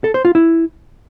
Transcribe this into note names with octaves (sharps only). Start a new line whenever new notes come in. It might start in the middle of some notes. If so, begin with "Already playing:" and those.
A4
C5
F4
E4